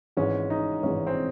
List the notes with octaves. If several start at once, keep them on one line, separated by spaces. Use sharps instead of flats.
G#1 G#2 E3 G#3 C#4
D#4
G#1 G#2 E3 G#3 C#4
C4